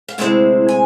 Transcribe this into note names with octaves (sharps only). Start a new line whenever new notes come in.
F5
D2 C3 G#3 C4 E4 E5
G#5